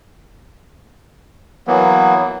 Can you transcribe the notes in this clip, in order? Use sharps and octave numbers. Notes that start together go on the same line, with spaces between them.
E3 F#3 A#3 B3